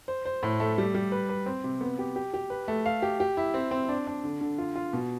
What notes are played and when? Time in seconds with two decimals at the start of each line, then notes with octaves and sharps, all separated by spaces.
0.08 C5
0.25 C5
0.43 A2
0.60 A3
0.78 G3
0.94 G3
1.12 B4
1.29 B4
1.46 C4
1.64 C3
1.81 B3
1.99 G4
2.16 G4
2.34 G4
2.50 B4
2.68 A3
2.86 F5
3.02 G4
3.20 G4
3.37 E4
3.54 C4
3.71 C4
3.89 D4
4.07 D4
4.24 D3
4.41 D3
4.58 F4
4.76 F4
4.93 B2